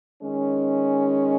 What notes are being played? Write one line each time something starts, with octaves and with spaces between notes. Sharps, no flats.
D#3 G#3 C#4